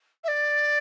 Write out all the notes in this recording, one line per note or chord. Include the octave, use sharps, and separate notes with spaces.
E5
D5